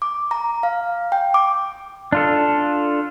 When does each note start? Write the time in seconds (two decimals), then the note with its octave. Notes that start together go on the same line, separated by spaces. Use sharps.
0.02 D6
0.31 A#5
0.63 F5
1.12 G5
1.34 D6
2.12 D4 F4 A4